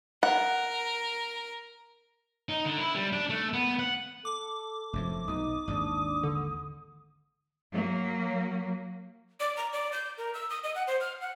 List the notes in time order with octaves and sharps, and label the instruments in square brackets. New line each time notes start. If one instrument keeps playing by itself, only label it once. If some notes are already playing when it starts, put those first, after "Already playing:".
[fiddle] A#4 [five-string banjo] F#5
[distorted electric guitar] D#4
D3
E4
G3
D4
A3
B3
F#5
[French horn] A4 [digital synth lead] D6
[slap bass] F1 F#2 F3 [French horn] A3
[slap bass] B1 B2 [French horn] D#4 [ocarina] D#6
[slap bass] G#1 D#2 G#2 [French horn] D4
[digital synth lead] D3
[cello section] F#3 A#3
[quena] D5
A#5
D5
G6
A#4
E6
D#6
D#5
F#5
C5
F6
F#5